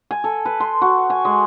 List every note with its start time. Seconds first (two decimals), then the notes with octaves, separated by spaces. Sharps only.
0.11 G#5
0.24 A4
0.46 B4
0.60 C6
0.82 F#4
1.10 G#5
1.25 G#3